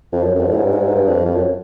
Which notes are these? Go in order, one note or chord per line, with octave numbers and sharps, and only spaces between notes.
F2
F#2
F#2
F2
G2
A2
G#2
G2
G#2
G2
G#2
G2
F2
F2
F#2